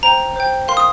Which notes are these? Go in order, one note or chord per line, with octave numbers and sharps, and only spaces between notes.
C5 G5 A#5
C5 G5
A#4 F5 C6
D#6